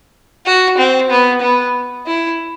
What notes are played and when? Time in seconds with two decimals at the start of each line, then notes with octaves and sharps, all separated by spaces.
0.46 F#4
0.78 C4
1.10 B3
1.41 B3
2.07 E4